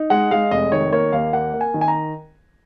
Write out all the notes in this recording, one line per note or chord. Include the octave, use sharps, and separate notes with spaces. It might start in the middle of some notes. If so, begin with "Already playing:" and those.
Already playing: D#4
G#3 F#5
G#3 F5
F1 D#5
D#3 C#5
A#3 C#5
D#2 F5
A#3 F#5
A#3
G#5
D#3
G#5
A#5